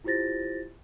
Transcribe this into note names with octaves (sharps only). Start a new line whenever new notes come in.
E4 F4 G4 C5 A6 A#6